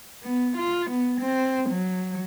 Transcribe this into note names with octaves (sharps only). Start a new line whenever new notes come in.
B3
F4
B3
C4
F#3